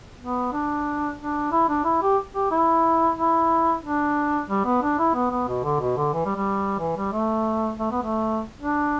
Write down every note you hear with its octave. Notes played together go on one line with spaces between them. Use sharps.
B3
D4
D4
E4
D4
E4
G4
G4
E4
E4
D4
G3
B3
D4
E4
B3
B3
B2
D3
B2
D3
E3
G3
G3
E3
G3
A3
A3
B3
A3
D4